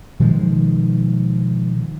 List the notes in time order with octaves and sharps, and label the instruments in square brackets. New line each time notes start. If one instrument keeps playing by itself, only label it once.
[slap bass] B2 D#3 F3 G#3